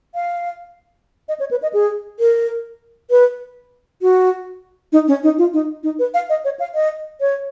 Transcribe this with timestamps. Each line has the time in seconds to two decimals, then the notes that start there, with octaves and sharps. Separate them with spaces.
0.15 F5
1.28 D#5
1.40 C#5
1.51 B4
1.62 D#5
1.73 G#4
2.20 A#4
3.10 B4
4.02 F#4
4.92 D#4
5.08 C#4
5.23 D#4
5.38 F4
5.53 D#4
5.83 D#4
5.99 B4
6.14 F5
6.30 D#5
6.45 C#5
6.59 F5
6.75 D#5
7.21 C#5